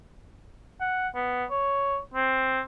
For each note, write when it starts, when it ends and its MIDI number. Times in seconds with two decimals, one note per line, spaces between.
0.81 1.08 78
1.15 1.45 59
1.50 1.98 73
2.14 2.61 60